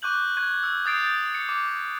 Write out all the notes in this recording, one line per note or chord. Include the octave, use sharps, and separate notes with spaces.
C#6 D6 F#6 G6 F#7
C#6 F#6 G#6
E6
D#6 G6 A6 C7 D7
C#7
D6